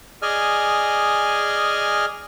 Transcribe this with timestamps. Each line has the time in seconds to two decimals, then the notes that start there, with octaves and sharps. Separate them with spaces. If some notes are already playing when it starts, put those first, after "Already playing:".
0.22 G#4 D5 D#5 G#5 F6